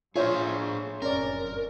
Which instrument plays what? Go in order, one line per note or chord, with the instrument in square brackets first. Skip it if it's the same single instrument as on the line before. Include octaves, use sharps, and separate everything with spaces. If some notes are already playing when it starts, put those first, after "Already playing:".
[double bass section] A2 [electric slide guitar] D4 G#4 [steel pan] F4 [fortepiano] C5 C#5 E5
[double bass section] F1 F#2 [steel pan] C#4 D5 [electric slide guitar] A#4